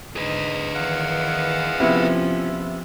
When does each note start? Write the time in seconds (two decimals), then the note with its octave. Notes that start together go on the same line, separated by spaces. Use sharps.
0.16 G#2 D3 D#4 G#4 B4
0.74 D#3 E3 F5 F#5
1.80 C3 F3 B3 C#4 E4